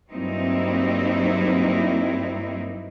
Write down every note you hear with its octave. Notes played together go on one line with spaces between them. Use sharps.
G2 F#3 A#3 C4 D#4 E4